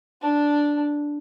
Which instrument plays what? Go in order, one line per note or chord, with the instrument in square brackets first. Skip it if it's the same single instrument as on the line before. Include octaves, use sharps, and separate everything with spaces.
[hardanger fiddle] D4